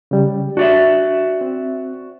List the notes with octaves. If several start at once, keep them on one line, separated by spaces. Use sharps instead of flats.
C#3 G3
D4 F#4 D5 E5
C4